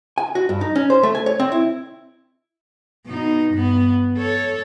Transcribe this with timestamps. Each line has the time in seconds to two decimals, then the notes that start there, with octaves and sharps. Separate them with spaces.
0.18 G#5
0.35 F#4
0.49 G2
0.61 D#4
0.76 C#4
0.90 C5
1.03 A3
1.15 G#5
1.26 C#5
1.40 C4
1.52 E4
3.06 B2 D#4
3.51 G2 B3
4.18 A4 C#5